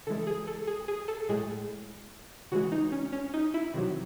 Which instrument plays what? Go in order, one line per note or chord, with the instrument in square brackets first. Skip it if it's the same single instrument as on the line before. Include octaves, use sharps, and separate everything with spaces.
[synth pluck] C#3 E3 G#3 A4
G#4
A4
G#4
G#4
A4
A2 G#3 G#4
C#3 E3 G#3 F#4
D#4
C#4
C#4
D#4
E4
C3 D#3 F#3